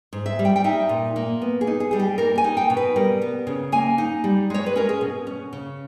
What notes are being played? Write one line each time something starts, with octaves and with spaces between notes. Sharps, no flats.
G#2
E5
G3
G5
G5
D#4 E5
A#2
A#3
B3
G#4
D#4
G#4
G3 G#4
G4
A#3 A#4
G#5
D#4
G5
B2
B4
G3 A#4
B3
C#3
A#3 G#5
D#4
G3
G#3 C#5
B4
C#4 A#4
G#4
B2
C#4
C#3